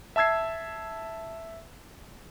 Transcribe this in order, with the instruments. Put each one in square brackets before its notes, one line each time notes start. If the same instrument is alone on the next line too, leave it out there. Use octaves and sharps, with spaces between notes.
[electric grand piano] E5 A5 E6 G#6 C7